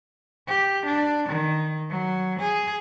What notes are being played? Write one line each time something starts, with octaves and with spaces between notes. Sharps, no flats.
G4
D4
D#3
F#3
G#4